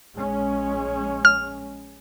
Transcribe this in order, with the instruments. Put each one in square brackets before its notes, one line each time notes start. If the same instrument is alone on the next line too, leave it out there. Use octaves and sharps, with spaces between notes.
[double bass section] A#1 G#3 C#4
[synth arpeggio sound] F6